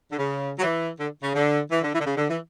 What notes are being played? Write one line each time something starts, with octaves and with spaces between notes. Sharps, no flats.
D3
C#3
F#3
E3
D3
C#3
D3
E3
D3
E3
D3
C#3
D3
E3